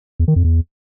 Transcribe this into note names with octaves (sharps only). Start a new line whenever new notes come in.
E2
D#3
F2
E2